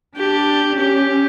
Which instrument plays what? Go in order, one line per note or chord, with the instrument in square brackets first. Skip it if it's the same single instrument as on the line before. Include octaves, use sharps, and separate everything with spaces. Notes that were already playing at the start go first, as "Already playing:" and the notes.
[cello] D4 [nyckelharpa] G4
[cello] C#4 [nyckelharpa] G4